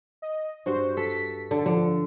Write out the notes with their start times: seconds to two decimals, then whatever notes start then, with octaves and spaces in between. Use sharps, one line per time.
0.22 D#5
0.66 G2 F#4 C5
0.97 A4 B6
1.51 D3 A4
1.66 D3 F3